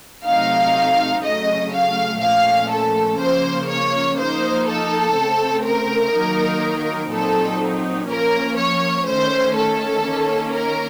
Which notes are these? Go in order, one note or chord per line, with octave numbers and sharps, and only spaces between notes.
C3 F#3 A3 D#4 F5
C#3 F#3 A3 D#5
F5
A#2 F3 A3 C#4 F5
A4
C#3 F3 A#3 C5
C#5
F3 A#3 D#4 C5
A4
C#3 A3 C4
A#4
D#3 F#3 A#3 D#4
A#2 F#3 C4 D#4 A4
F3 A#3 C#4 A#4
C#5
D#3 A3 C#4 C5
A4
D#3 A#3 C#4
A#4